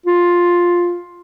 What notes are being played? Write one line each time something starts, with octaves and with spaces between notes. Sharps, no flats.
F4